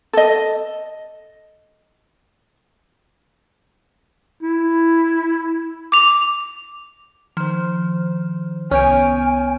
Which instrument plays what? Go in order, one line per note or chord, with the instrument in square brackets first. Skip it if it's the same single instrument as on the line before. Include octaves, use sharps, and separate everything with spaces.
[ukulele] A4 D#5
[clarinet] E4
[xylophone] D6 F7
[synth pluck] D#3 C5 [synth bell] F3
[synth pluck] C2 B3 C#5 [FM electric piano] C#4 [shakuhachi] G#5 [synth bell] F6 G6 D7